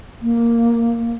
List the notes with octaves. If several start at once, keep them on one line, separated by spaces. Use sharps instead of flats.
A#3